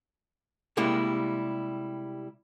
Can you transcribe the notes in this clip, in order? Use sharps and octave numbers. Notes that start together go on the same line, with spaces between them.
C3 G3 G#3 A#3 E4